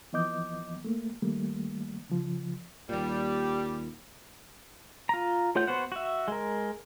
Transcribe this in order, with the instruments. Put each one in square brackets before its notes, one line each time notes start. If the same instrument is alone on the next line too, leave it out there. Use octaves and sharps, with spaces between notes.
[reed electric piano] E3 F3 B3 D#5 D6 G6
A3 A#3
D#3 G3 A3 A#3
C#3 F3
[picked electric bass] D#2 A#2 [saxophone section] G3
[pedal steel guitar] F4 A#5
A3 F4 C#5 F#5 G6
B3 F#4 C5 F#5
F#4 E5
G#3 A#4